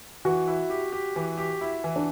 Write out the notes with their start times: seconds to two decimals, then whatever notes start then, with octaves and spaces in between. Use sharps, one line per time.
0.25 E3 F#4
0.48 E4
0.70 G4
0.92 G4
1.16 E3
1.37 G4
1.61 E4
1.84 E3
1.96 D4